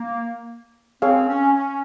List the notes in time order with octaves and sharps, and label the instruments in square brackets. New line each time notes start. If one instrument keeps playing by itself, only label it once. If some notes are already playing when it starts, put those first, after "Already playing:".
Already playing: [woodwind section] A#3
[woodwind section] C4 [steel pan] G#4 C#5 F5
[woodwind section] C#4
C#4